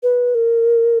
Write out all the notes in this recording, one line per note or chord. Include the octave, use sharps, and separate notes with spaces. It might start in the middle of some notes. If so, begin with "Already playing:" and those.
B4
A#4